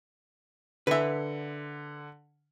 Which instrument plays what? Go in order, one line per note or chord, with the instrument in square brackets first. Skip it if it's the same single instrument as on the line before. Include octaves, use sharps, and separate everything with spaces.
[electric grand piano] D3 [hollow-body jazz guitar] B4 E5